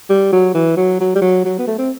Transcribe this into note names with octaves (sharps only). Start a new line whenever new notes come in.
G3
F#3
E3
F#3
F#3
G3
F#3
F#3
B3
A3
C4